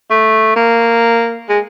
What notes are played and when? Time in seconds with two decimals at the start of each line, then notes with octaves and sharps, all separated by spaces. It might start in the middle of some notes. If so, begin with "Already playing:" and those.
0.10 A3
0.56 A#3
1.49 G#3